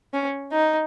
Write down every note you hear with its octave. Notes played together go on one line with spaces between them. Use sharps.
C#4
D#4